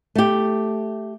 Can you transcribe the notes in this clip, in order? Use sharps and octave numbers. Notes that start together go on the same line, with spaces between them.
A3 G4